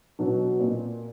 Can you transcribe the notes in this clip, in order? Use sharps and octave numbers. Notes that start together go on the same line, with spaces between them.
B2 F#3
A#2